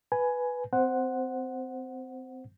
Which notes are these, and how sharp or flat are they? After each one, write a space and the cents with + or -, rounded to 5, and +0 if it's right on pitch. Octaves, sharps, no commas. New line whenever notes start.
B4 +0 G#5 +10
C4 -25 C5 +0 F#5 +0